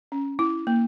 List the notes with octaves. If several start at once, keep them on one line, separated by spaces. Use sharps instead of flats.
C#4
E4
A#3